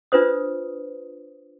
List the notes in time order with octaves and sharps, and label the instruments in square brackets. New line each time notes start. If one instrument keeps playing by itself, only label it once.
[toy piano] D4 F4 B4 C5 D#6